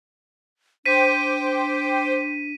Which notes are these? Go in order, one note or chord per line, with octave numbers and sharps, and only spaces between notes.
D4 C5 G5 D6 B6 D#7